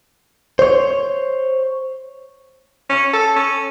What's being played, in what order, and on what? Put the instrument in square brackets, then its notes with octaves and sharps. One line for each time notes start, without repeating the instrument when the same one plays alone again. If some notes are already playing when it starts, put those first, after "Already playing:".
[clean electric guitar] C5 C#5
[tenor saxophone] C#4
A4
C#4